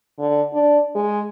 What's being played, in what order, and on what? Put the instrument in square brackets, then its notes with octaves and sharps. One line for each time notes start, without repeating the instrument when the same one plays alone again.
[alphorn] D3
D4
G#3